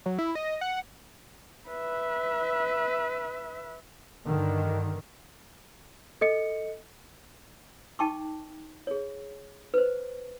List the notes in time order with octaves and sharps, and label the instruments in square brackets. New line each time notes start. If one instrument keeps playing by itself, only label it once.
[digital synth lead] F#3
E4
D#5
F#5
[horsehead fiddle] B4 E5
[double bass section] G2 D3 D#3
[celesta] A4 D#5 C#7
[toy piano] D#4 G5 A5 C#6 D6
G#4 C#5
B4 C5